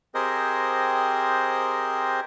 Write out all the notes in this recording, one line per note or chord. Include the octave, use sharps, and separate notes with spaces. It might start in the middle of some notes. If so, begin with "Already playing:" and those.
C4 G4 G#4 A#4 C5 D#5